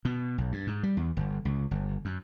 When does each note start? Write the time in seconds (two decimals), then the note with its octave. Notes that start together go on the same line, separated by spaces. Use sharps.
0.05 B2
0.38 B1
0.52 G2
0.67 G#2
0.83 G3
0.97 E2
1.17 G1
1.45 C#2
1.71 G1
2.05 F#2